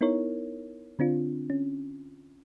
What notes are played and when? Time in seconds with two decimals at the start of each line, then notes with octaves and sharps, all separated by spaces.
0.01 B3 D#4 E4 A#4 C#5
0.99 D3 C4 D4 F4
1.50 C#4